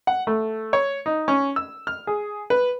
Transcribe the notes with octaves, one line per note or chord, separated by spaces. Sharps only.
F#5
A3
C#5
D#4
C#4
E6
F6
G#4
B4